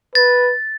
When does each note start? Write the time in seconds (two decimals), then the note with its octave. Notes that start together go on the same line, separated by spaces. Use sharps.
0.15 B4 A6